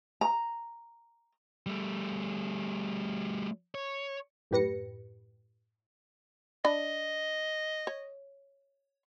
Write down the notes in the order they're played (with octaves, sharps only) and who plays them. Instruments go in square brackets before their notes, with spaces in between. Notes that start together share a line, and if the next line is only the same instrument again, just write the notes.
[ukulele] A#5
[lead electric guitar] G3 A3
C#5
[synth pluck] F#2 A2 G4 B4 A#6 C#7
[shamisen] D4 B5 [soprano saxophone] D#5
[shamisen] C#5